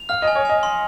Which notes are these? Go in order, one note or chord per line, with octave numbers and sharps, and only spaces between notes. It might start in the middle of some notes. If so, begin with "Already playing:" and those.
Already playing: F7
F5 F6
D#5
G#5
C#5
D#5 G#5
C6